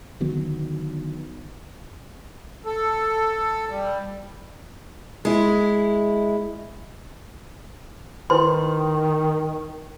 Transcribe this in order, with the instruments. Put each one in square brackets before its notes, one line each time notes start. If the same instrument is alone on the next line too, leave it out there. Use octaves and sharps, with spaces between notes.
[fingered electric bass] D3 D#3 F#3 B3
[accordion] A4
G3
[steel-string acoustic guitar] G#3 E4
[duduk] D#3 [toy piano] E4 B4 C6